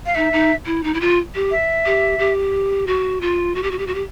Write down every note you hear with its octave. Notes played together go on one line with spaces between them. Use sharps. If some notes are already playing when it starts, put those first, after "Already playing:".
F5
D#4 E5
D#4
E4
D#4
E4
F4
G4
E5
G4
G4
F#4
F4
F#4
G4
F#4
G4
F#4
G4